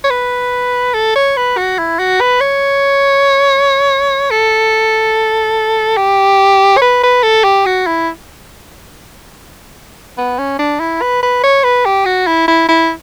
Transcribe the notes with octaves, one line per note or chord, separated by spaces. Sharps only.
C#5
B4
A4
C#5
B4
F#4
E4
F#4
B4
C#5
A4
G4
C#5
B4
B4
A4
G4
F#4
E4
B3
C#4
D4
E4
B4
B4
C#5
B4
G4
F#4
E4
E4
E4